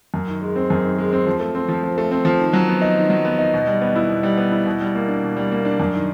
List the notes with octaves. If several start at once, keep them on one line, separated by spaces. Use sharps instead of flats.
F#2
D#3
G#3
C4
F#2
D#3
G#3
C4
F3
A3
C4
F3
F3
A3
C4
F3
D#3
F#3
B3
D#4
D#3
F#3
B3
D#4
B2
G3
B3
E4
B2
G3
B3
E4
B2
G3
A#3
D4
B2
G3
A#3
D4
F#2
D#3